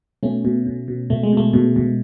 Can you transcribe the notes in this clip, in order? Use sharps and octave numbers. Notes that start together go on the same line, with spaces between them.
B2 A3 C#4
B2
B2
B2
B2 A3
G#3
B2 A3
B2
B2